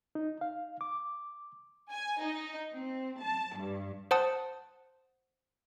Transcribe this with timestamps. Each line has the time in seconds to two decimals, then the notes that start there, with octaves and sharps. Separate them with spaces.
0.15 D#4
0.41 F5
0.81 D6
1.90 G#5
2.21 D#4
2.74 C4
3.23 A5
3.57 G2
4.11 C5 F#5 A5 D#6